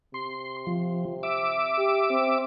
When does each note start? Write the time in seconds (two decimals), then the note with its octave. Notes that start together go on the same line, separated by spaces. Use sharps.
0.14 C3 C6
0.67 F3
1.23 E5 D6
1.77 G4
2.10 C4